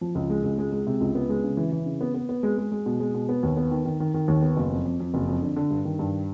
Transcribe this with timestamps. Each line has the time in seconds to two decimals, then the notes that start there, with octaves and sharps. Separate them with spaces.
0.01 F3
0.15 C#2
0.30 G#3
0.44 C#2
0.58 G#3
0.72 G#3
0.87 C3
1.00 C#2
1.15 B3
1.29 G#3
1.44 C#3
1.57 E3
1.72 E3
1.86 C#3
2.01 B3
2.14 B3
2.29 B3
2.43 G#3
2.58 G#3
2.71 G#3
2.86 B2
3.00 G#3
3.14 B2
3.29 B3
3.43 D#2
3.57 B3
3.71 D#3
3.85 D#3
4.00 D#3
4.14 D#3
4.28 D#2
4.42 B3
4.57 F#1
4.71 F2
4.85 F2
5.00 F2
5.14 F#1
5.28 F2
5.42 D3
5.56 D3
5.71 G2
5.85 D#3
5.99 G2